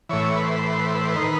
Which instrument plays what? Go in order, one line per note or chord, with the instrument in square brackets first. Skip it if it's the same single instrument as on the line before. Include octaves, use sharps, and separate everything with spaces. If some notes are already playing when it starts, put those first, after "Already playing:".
[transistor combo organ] A2 E3 C#5
B4
C5
B4
C5
B4
C5
B4
C5
B4
C5
B4
D#3 C5
B4